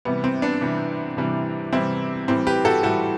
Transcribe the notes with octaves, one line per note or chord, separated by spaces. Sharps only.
C3 E3 G3 B3
C4
B3 D4
C3 E3 G3
C3 E3 G3
C3 E3 G3 C4 E4
A2 E3 G3 C4
G4 B4
F#4 A4
A2 E3 G3 F#4 A4